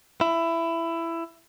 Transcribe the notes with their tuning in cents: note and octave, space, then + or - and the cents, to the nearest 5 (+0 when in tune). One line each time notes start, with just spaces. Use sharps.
E4 +15